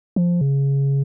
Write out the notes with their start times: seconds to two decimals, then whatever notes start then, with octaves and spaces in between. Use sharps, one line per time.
0.16 F3
0.41 C#3